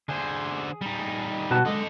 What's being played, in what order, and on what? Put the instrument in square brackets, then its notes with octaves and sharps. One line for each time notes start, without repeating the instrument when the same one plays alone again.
[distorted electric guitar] D3 C5 [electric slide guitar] G#4
[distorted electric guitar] G3 D#4
[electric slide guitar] B2 F#4 A5
[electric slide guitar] D3 G#3 [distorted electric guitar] A4 D#5